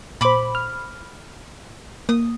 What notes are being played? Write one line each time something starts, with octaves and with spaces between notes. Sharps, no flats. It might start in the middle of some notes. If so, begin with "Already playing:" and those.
A#2 C5 B5 D6
F6
A#3 D#6